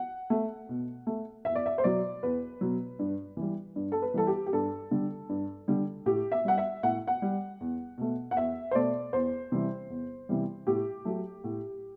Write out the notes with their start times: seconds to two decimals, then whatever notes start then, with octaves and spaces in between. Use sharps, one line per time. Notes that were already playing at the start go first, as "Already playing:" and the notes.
Already playing: F#5
0.30 A3
0.69 B2
1.07 A3
1.45 E2 E5
1.55 D5
1.66 E5
1.78 C5
1.83 B2 F#3 D5
2.23 E2 B4
2.61 B2 F#3
2.99 G2
3.37 E3 G3
3.76 G2
3.92 A4
4.02 B4
4.14 E3 G3 A4
4.27 G4
4.46 G4
4.53 G2 A4
4.91 D3 G3
5.29 G2
5.68 D3 G3
6.06 A2 G4
6.32 E5
6.45 G3 F#5
6.58 E5
6.83 A2 F#5
7.07 F#5
7.22 G3
7.60 E2
7.98 B2 A3
8.31 F#5
8.36 E2 E5
8.71 C5
8.75 B2 A3 D5
9.13 E2 C5
9.52 C3 E3 G3
9.90 E2
10.29 C3 E3 G3
10.67 A2 G4
11.05 F#3 A3
11.44 A2